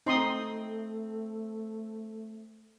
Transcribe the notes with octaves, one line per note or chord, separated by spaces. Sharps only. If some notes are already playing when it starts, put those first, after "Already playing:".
A3 C4 D#4 C6 D#6